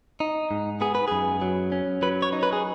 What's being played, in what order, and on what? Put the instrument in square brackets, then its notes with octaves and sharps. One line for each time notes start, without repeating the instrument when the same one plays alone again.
[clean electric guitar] D#4
G#2
B3 G#4
B4
F#2 G#4
F#3
C#4
F#3 B4
C#5
D#4
B4
G#4